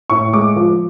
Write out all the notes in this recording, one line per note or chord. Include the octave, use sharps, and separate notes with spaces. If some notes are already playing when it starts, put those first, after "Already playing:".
A2 C#6
G#3 D6
F3